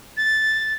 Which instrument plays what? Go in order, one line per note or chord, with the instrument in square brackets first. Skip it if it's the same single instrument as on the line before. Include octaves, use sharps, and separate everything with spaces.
[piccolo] A6